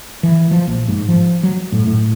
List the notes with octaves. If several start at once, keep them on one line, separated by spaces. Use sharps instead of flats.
E3
F3
A#1
G#2
F3
F#3
A2
A2